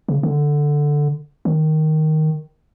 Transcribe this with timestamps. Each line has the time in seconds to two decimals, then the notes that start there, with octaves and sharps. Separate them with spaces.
0.09 C#3
0.23 D3
1.45 D#3